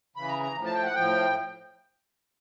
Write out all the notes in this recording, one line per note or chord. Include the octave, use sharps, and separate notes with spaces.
C#3 E3 B5
A#5
A#5
A2 F3
A5
G5
F#5
A2 F3 G5